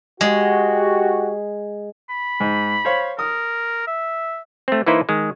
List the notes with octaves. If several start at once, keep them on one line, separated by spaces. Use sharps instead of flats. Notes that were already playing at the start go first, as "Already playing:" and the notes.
G#3 F#4 G4
B5
G#2
C5 C#5 F5
A#4 D#6
E5
A3 C4
E3 A#3 D#4 E4 B4 C5
D#3 G#3